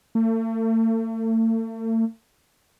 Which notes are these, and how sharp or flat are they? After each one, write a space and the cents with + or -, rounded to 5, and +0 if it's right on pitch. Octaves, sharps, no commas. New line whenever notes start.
A3 +40